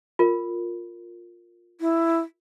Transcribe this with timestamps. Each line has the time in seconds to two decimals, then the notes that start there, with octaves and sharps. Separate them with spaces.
0.19 F4 A#4
1.81 E4